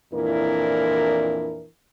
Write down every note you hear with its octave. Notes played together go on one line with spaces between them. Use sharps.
F2 A#2 E3 D4 E4 A#4